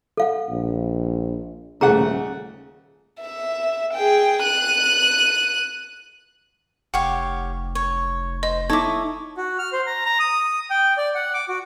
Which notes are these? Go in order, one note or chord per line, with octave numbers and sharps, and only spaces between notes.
A4 F5 F#5
A#1
D#1 C#3 A3 G#4 F#5 A#5
E5
G#4 G5
F#6 D#7
F1 G4 C#5 F5 F#5
C#5
C5 D#5
D#4 E4 A4 C#5 D6 D#6 G#6
F#4
F6
C5
A#5
A#5
D#6
G5
D5
F#5
D6
F#4